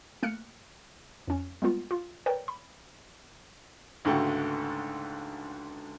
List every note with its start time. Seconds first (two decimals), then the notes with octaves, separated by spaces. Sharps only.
0.23 A3 A#3 F6 F#6 C#7
1.28 F2 C#4
1.62 G3 G#3 A#3 B3 F4
1.91 F4
2.26 A#4 B4 C#5 D5 G5
2.48 B5
4.05 C#2 G#2 D3 A3 F#4 G5